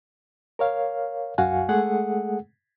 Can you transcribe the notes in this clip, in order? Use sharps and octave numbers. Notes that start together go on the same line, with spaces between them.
A#4 C#5 F5
C2 F#2 F#4 F5 F#5 G#5
G#3 A3 G#4 A4 F#5